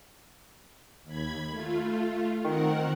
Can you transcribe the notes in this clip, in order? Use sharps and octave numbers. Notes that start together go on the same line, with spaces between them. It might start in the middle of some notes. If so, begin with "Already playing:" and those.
D#2 B5 G#6
A3 F4
D#3 C4 A#4 F#5